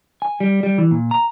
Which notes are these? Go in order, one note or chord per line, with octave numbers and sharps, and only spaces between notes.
G#5
G3
G3
E3
A#2
A#5